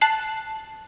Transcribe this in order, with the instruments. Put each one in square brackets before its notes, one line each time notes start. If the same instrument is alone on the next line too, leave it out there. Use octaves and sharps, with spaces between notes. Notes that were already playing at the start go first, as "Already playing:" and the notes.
[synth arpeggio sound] A5 F#6 C7